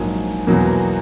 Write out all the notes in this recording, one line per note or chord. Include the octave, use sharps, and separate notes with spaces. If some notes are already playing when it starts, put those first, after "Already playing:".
Already playing: A#1 G#2 F#3 A#3 G#5
E2 B2 F#3 A#3